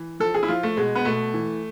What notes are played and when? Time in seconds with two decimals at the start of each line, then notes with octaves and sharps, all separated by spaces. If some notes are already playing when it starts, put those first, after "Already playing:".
Already playing: E3
0.20 F3 A4
0.34 G#4
0.43 E4
0.48 F3 F4
0.63 A3
0.77 B2 G#3
0.95 B3
1.05 B2 A3
1.34 E3